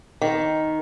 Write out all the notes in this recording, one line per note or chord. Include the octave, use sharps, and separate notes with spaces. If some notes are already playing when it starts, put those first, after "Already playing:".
D#3